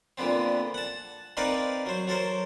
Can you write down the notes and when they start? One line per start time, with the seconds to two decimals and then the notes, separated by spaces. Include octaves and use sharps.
0.18 A#2 D3 B3 C4
0.74 F#5 A5
1.37 C4 D#4 A#4 B4 D5 F5
1.86 F#3 C5
2.07 F#3 A4 A#4 C5